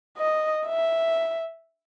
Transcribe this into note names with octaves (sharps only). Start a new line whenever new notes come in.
D#5
E5